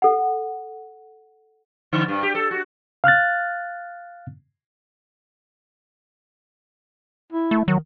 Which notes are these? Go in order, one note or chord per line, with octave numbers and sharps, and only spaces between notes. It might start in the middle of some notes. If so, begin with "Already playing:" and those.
A4 F#5
D3
G2
G4
A4
F#4
F5 F6 F#6 A6
E4
A3
D#3 F#3